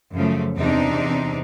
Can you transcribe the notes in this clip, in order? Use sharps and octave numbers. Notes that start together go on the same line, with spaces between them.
F#2 C#3 F3 A3
E2 C3 C4 D4 D#4